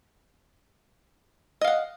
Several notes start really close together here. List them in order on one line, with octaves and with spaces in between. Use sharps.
D#5 F5 F#5